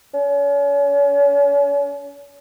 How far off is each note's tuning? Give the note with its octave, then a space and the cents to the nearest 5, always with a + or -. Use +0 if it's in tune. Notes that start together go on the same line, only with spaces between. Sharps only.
C#4 +40